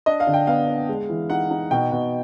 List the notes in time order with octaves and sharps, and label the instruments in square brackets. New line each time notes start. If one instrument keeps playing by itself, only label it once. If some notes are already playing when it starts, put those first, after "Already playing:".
[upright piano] D4 [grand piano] D#5
[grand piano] F5
[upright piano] D3
[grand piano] G5
[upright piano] B3 [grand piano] F5
[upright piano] D4
G#3
E3
[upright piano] D#4 [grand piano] F#5
[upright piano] D#4
[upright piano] B2 [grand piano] G5
[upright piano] B2